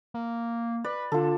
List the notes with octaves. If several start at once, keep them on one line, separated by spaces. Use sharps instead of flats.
A#3
B4 D5
D3 F4 A4